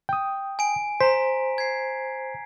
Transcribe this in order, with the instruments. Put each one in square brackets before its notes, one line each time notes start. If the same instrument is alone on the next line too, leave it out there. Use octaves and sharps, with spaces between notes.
[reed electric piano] G5 D#6
[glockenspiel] G#5 D7
[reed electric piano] C5 [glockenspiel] A#5 B6
[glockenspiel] G#6 C7